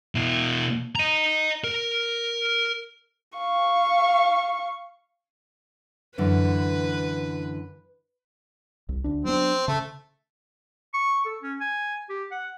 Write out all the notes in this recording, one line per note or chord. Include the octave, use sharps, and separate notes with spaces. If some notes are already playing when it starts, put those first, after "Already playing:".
B2 E4
D#5 A#5
A#4
F5 C#6
F#2 D3 E3 B4
C2
D2 D4
F#3 B3 C4 D4
C#3 A3
C#6
A4
C#4
G#5
G4
F#5